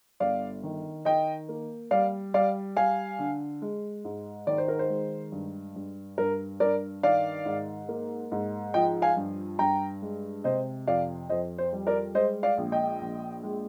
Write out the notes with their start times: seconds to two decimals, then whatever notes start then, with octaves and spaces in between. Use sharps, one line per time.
0.20 G1 D5 F5
0.63 D#3
1.05 D#3 D#5 G5
1.49 A#3
1.91 G3 D5 F5
2.34 G3 D5 F5
2.76 G3 F5 G#5
3.19 D3
3.62 G#3
4.05 G#2
4.47 D#3 D5
4.58 C5
4.68 A#4
4.79 C5
4.90 G#3
5.32 G2
5.76 G2
6.18 G2 A#4
6.60 G2 A#4 D5
7.03 D#3 D5 F5
7.45 G#2
7.89 A#3
8.32 G#2
8.74 F3 D#5 G5
9.02 F5 G#5
9.16 G2
9.59 G2 G5 A#5
10.02 G#3
10.44 C3 C5 D#5
10.87 F2 D5 F5
11.29 F2 C5 D#5
11.58 C5
11.73 G3
11.87 A#4 D5
12.15 G#3 C5 D#5
12.43 D5 F5
12.58 A#1
12.72 D#5 G5
13.01 A#1
13.43 G#3